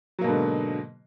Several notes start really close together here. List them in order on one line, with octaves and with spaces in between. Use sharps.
F#3 A#3 B2 G#2 D3